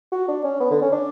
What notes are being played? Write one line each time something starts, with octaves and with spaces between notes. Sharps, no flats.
F#4
D4
C#4
B3
D3
C#4
D4